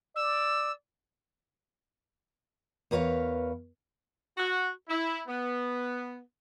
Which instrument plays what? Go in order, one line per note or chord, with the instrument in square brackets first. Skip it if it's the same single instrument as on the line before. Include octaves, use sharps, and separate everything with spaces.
[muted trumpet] D5 [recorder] E6
[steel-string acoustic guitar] E2 A#4 B4 C#5 F5
[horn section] F#4
E4
B3